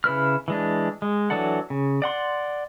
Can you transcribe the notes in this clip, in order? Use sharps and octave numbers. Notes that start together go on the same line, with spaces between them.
C#3 E4 B4 F6
E3 G#3 D4
G#3
E3 F#3 D4 A4 F#5
C#3
D5 F#5 C6